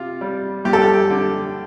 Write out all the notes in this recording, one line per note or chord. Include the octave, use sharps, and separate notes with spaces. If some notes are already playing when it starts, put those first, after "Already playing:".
Already playing: C3 F4
G3
G2 G4
A4
G4
D3